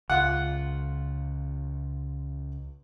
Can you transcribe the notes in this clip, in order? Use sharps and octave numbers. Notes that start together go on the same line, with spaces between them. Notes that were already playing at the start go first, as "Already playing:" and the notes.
C#2 F4 F#5